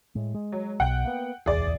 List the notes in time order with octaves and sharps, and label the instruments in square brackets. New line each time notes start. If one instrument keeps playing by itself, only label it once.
[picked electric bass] A2 G#3
G#3
[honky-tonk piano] F#3
[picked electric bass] B1 B2 [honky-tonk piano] F#5 G5
[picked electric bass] A#3 B3
[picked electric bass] D1 B1 E2 [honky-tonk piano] G#4 D5